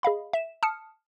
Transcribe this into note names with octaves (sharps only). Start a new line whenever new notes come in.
G#4 D#5 F5 B5
E5 E7
A5 D#6 F6 C#7